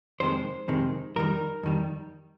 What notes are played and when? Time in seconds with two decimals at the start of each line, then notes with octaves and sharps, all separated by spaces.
0.20 F2 C3 D#3 G#3 C5
0.68 F2 C3 D#3 G#3
1.16 F2 D#3 G3 A#4
1.63 F2 D#3 G3